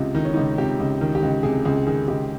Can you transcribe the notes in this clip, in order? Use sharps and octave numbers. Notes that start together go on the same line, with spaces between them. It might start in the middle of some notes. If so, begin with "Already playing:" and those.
Already playing: C#2 C3 F4
D#3 D#4
C#4
C#2 D#4
C3 G4
C#2
D#3
G4
C#2
C3 G#4
C#2 G#4
D#3 G#4
C#2 G4